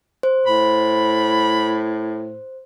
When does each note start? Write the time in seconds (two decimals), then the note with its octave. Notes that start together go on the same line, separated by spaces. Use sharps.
0.23 C5
0.46 A2 B5